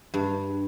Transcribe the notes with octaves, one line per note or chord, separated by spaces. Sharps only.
G2